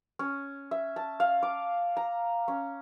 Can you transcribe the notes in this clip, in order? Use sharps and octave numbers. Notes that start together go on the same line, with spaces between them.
C#4
E5
A5
F5
D6
A#5
C#4